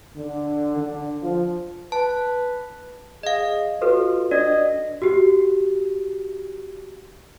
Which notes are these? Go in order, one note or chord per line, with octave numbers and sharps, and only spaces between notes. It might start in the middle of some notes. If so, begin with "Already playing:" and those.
D3
D3
F3
B4 A5
G#4 D#5 F5
F4 F#4 A4 B4
D4 D5 D#5
F#4 G4